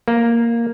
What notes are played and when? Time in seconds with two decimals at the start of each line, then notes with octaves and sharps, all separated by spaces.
0.08 A#3